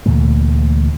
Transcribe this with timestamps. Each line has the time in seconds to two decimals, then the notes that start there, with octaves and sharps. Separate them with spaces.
0.06 D2 A#2 E3 A3